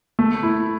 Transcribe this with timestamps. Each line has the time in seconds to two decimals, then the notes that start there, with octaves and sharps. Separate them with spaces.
0.19 A3
0.43 E4